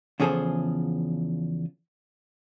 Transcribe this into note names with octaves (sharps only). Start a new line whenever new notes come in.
E2 C#3 F3 G#4 A4 C5